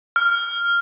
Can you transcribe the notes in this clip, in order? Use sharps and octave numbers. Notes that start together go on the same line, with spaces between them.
F6